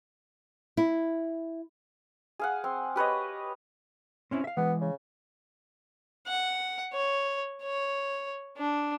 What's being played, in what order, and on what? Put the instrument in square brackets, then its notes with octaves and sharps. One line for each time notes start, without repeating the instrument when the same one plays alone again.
[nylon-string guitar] E4
[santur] G#4 F5 F#5
C4
G4 B4 C#5 D#5
[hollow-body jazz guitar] C4 C#4 E4
E5 F5
[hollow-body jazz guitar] E3 G#3 [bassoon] B3
[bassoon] C#3
[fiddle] F#5
C#5
C#5
D4